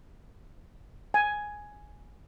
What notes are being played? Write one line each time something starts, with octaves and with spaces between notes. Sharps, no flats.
G#5